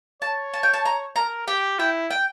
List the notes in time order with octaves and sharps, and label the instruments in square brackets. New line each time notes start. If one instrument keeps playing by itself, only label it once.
[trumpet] C#5 [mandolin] A5
[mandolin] A5
G5
A5
A#5
[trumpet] A#4 [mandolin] A#5
[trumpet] G4 [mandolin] G5
[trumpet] E4 [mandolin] G5
[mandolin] G5